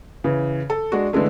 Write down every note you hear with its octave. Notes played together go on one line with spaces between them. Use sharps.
C#3 E3
A4
G#3 D4 F#4
D3 E3 G#3 A3